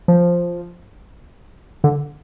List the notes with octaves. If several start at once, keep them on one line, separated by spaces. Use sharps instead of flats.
F3
D3